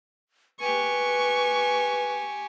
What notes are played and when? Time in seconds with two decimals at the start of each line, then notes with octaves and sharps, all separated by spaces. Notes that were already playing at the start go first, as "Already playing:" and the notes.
0.60 G4 B4 G#5 C#6